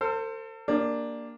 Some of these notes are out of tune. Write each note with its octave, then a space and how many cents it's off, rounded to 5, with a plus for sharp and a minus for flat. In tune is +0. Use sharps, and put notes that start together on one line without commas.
A4 +40 C5 +0
A#3 +0 D4 +0 G4 +35